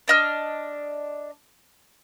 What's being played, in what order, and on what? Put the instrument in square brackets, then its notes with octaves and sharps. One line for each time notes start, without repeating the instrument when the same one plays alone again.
[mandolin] D4 D#5 F6